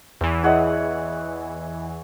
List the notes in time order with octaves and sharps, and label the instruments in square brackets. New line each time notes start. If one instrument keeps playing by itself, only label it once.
[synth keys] E2 E3
[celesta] E4 D#5 E5 [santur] G#4 C#5 F#5